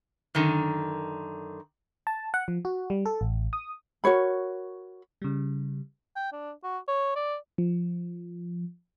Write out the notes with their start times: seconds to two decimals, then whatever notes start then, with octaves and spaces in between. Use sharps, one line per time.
0.35 F#2 D3 D#3
2.07 A5
2.34 F#5
2.48 F3
2.65 F#4
2.90 G3
3.06 A4
3.21 A1
3.53 D#6
4.04 F#4 A#4 C#5 B5
5.22 C#3 G3
6.16 G5
6.33 D4
6.64 F#4
6.88 C#5
7.16 D5
7.58 F3